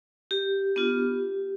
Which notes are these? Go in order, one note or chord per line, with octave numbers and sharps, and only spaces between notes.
G4
B3 D4 F4